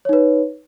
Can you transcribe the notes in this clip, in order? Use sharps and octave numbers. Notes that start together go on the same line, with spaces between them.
D#4 B4 C#5